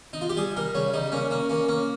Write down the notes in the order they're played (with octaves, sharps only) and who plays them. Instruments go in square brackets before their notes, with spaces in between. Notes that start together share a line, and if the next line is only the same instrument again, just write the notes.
[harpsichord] D#4
F4
G4
G3 G#4
G3 A#4
C#3 C#5
G3 D#4
A#3 C#4
A#3 C#4
A#3 C#4
A#3 C#4